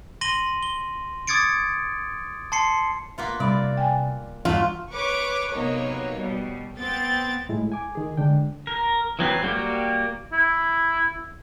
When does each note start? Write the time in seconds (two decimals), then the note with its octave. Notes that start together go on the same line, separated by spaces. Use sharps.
0.21 C6 A#6 D#7 F#7 G7
0.63 G7
1.27 D6 D#6 G#6 A6 C#7 D7
2.52 A5 C6 C7 C#7
3.18 A#3 B3 F4
3.40 C3 G3 D5 B5
3.77 G5 G#5
4.45 E2 G2 F#3 A3 F4
4.92 B4 C#5 C#6 D6
5.53 C3 F#3 A#3 B3 D#4 C#5
6.16 B2 G3
6.77 B3 C4 G5 A6
7.49 A2 G#3 E4
7.72 G#5 D6
7.95 D#3 G#4
8.17 D3 G#3 D4 G5
8.67 A#4
9.19 E3 F#3 C4 B4
9.43 G3 A#3 F#4 G4
10.33 E4